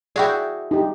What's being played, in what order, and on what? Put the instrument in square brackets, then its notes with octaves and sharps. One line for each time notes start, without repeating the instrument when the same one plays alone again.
[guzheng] E4 F#4 G#4 [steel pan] D5 G5
[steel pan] D#4 G4